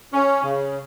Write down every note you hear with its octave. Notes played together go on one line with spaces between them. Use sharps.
C#4
C#3